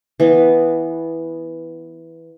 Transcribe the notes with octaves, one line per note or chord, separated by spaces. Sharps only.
E3 B3